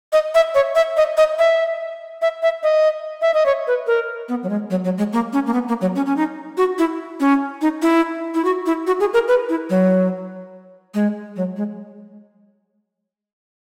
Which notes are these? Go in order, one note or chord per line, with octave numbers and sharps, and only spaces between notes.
D#5
E5
C#5
E5
D#5
D#5
E5
E5
E5
D#5
E5
D#5
C#5
B4
A#4
B3
F#3
G#3
F#3
F#3
G#3
A#3
C#4
A#3
B3
A#3
F#3
C#4
C#4
D#4
F#4
E4
C#4
D#4
E4
E4
F#4
E4
F#4
G#4
A#4
B4
E4
F#3
G#3
F#3
G#3